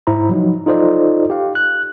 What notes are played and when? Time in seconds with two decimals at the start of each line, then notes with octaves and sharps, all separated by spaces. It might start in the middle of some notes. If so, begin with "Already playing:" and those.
0.07 G#2 E4 C5 A#5 B5
0.29 F3 F#3 D#4
0.66 D#4 F4 A4 C5 D5 D#5
1.30 G4 F5
1.55 F#6